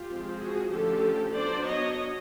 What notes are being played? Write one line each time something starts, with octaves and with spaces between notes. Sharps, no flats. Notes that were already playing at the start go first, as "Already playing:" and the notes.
Already playing: F4 G4
F3 G#3 C4
F#4 G#4
D3 F3 A3 C#4 G4 A4
F#3 B3 D4 C5 D5
C#5 D#5